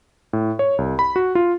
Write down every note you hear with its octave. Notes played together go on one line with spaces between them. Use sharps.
A2
C#5
C2
B5
F#4
F4